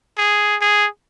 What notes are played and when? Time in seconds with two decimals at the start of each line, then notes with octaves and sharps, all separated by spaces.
0.18 G#4
0.61 G#4